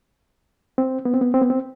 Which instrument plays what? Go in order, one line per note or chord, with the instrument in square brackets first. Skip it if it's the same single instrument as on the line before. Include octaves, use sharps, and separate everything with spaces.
[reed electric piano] C4
B3
C4
B3
C4
B3
C4